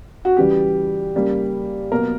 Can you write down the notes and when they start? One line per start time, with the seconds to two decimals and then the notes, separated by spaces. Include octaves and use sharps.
0.25 F#4
0.37 C#3 E3 G3 G4
1.15 C#3 G3 A#3
1.92 B2 F#3 A#3 A#4